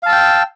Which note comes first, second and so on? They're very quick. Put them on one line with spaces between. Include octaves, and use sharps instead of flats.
F5 A5 E6 G5